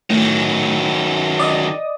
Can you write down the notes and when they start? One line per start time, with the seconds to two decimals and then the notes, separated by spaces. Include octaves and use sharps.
0.10 A2 D#3 F#3
1.39 D5 D#5 D#6